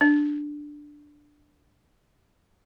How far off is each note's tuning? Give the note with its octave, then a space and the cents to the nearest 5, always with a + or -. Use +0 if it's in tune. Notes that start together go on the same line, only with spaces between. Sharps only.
D4 +5